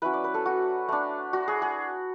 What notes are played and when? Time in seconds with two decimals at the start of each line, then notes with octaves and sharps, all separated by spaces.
0.02 F#3 C#4 E4 B4
0.13 D5
0.24 B4
0.34 A4
0.46 F#4
0.88 A3 D4
1.33 F#4
1.48 G#4
1.62 G#4